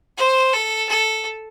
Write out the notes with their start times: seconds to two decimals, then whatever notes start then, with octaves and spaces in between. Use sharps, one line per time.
0.18 C5
0.53 A4
0.89 A4